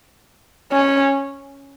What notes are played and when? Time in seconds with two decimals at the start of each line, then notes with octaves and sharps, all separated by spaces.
0.73 C#4